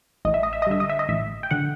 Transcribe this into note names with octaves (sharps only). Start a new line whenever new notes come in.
A1 D#5
E5
D#5
E5
D#5
G2 D3 E5
D#5
E5
D#5
A1 E5
G5
D3 F#5